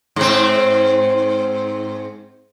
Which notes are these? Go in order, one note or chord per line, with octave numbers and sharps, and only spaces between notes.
G#2 C4